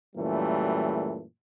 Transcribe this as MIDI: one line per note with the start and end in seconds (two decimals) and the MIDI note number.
0.16 1.23 42
0.16 1.23 46
0.16 1.23 52
0.16 1.23 55
0.16 1.23 57